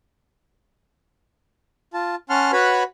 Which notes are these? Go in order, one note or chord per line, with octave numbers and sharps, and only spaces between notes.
F4 A5
C#4 F#5 A5 C6 F6
F#4 B4 C#5 F#5 B5